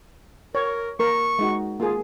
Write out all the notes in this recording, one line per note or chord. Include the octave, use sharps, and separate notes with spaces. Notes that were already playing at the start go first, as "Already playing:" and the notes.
A#4 C#5
A#3 A#4 C#6
G#3 D#4 F#4
A#3 F4 G#4